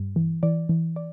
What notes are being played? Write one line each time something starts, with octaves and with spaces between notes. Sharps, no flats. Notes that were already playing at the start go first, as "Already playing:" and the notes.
Already playing: G2
E3
E3 D5
E3
D5